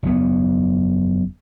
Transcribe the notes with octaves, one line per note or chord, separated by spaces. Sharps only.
F#1 E2 B3